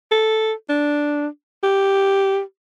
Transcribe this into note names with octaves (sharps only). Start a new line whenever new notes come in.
A4
D4
G4